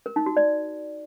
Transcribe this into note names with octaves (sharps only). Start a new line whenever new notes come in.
A#4
D#4
F#4
D5